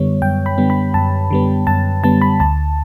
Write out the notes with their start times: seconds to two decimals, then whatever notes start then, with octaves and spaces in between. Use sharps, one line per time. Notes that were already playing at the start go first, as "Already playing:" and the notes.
Already playing: F#2 D3 G3 B3 C#5
0.22 F#2 G5
0.46 B5
0.58 D3 G3 B3
0.70 B5
0.94 F#2 A5
1.31 D3 G3 B3
1.67 F#2 A5
2.03 D3 G3 B3 A5
2.22 B5
2.40 D2 A5